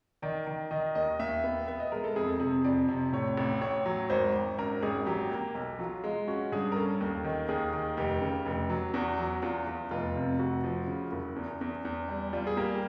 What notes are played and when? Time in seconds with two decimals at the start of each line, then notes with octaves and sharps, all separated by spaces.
0.22 D#3 D5
0.47 D#3
0.71 D#3 D#5
0.95 D#2 D#5
1.19 D#2 E5
1.44 B3
1.67 B3 E5
1.80 D#5
1.92 G#3 A#4
2.04 A4
2.16 F2 G#4
2.28 A4
2.40 C3 G#4
2.64 F2 D5
2.89 C3
3.12 A2 C#5
3.37 A1
3.61 A1 C#5
3.86 F#3
4.10 G#1 C5
4.34 G#1
4.58 F#2 A#4
4.82 G#1 G#4
5.06 F#3 G4
5.31 A#3
5.55 B1
5.79 F#3 F4
6.04 G#3 F4
6.28 C#4 F#4
6.52 G2 G#4
6.72 A#4
6.76 C#4 A4
7.00 D#2
7.24 D#3
7.48 D#2 G#4
7.73 D#3
7.97 F1 G4
8.21 C#3
8.46 F1
8.70 F#3
8.94 E2 F#4
9.18 F#3
9.42 E2 F4
9.67 E2
9.91 F1 F4
10.15 C3
10.39 F1 F#4
10.64 F3
10.87 C#3
11.12 F#1
11.36 E2
11.61 E2
11.85 E2
12.08 G3
12.33 G3 F4
12.47 G#4
12.57 A#3 G4